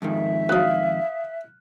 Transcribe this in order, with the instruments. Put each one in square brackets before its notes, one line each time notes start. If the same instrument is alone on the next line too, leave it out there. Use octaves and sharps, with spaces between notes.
[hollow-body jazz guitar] F2 G#2 D#3 [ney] E5
[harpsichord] D2 F#3 [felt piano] F5 D#6 F#6